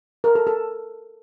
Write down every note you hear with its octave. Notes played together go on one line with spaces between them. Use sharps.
A#4
A4
A4